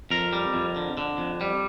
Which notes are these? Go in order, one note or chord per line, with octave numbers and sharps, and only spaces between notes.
F2 A#4
G3
F2
D3
D3
F2
G3